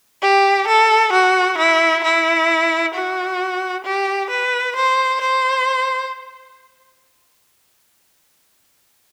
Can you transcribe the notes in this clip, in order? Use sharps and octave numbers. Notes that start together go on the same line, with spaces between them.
G4
A4
F#4
E4
E4
F#4
G4
B4
C5
C5